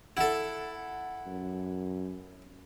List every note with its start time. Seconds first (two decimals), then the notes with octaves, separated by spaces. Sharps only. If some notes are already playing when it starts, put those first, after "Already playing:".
0.17 E4 A4 F#5
1.26 F#2